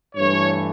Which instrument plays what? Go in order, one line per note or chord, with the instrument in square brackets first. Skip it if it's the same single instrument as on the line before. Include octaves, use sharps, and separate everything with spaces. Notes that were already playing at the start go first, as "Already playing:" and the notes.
[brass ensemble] G2 E3 A3 C#5